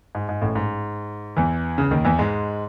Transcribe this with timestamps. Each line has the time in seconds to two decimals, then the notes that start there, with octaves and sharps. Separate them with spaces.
0.15 G#2
0.29 G#2
0.42 A1 A2
0.55 G#2
1.37 E2 E3
1.78 C#2 C#3
1.91 D#2 D#3
2.05 E2 E3
2.19 G#2 G#3